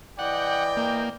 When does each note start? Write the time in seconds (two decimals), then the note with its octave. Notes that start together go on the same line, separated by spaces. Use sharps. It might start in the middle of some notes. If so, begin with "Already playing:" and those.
0.19 E3 D5 D#5 F#5 G5
0.77 A#3